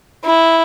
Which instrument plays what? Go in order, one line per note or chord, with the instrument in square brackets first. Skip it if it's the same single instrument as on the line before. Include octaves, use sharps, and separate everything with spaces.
[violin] E4